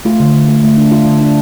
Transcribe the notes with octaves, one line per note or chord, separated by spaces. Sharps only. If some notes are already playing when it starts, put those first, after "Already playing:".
A3 F4
D3
D3
A3
A3
D4
D4 F4
D3
D4